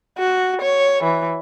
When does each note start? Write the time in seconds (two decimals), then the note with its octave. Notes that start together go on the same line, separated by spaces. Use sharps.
0.18 F#4
0.61 C#5
1.03 E3